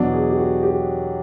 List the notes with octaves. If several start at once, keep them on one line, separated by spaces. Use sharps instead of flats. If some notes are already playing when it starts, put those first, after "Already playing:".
Already playing: E2 B2 F#3 D4
G#4
G4
F#4
G4